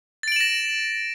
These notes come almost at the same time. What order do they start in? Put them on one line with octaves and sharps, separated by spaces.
A6 D7 F#7 E7 A#6